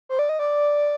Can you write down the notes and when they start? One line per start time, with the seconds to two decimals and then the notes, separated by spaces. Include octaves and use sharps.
0.09 C5
0.19 D5
0.29 D#5
0.39 D5